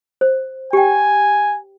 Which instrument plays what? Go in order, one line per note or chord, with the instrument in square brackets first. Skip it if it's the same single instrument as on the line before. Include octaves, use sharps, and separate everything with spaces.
[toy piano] C5
[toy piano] G4 G5 [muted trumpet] G#5